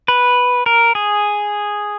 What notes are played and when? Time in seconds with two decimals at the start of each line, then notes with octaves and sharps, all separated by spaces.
0.08 B4
0.66 A#4
0.95 G#4